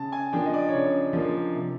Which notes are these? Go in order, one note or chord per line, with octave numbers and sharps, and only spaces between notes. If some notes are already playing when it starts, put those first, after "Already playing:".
Already playing: C#3 A5
G#5
F3 A#3 D4 G5
D#5
D5
C#5
C#3 D5
F3 A#3 D4
C3